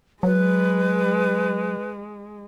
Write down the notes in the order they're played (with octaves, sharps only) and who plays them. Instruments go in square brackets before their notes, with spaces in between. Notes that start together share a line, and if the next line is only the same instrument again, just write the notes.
[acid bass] F#3 [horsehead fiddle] G#3 [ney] B4